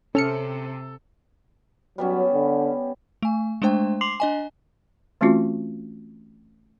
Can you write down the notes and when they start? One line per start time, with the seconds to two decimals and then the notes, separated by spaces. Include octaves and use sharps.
0.15 C3 C#4 A4 F6 C#7
1.98 F#3 G3 B3 C#4
2.33 D3
3.22 A3 G#5
3.62 G#3 A3 D4 C5 G5
4.01 C6 D6 C7 F7 F#7
4.20 D4 D#5 G#5
5.21 E3 A3 C4 C#4 F4 F#4